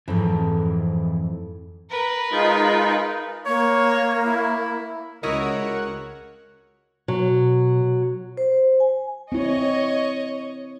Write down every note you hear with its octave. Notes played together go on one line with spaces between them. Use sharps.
F2 G#2 E3 C4
A#4 B4
G#3 D#4 F4
A#3 C#5
E4
C#2 E4 F#4 A#4 C#5 D#5 F#5
B2 F#3
C5
G#5
C4 E4 C#5 D#5 C#6